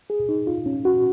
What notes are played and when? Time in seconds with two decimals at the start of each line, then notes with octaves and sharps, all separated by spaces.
0.10 G#4
0.29 D#4
0.47 F4
0.66 C#4
0.85 F#4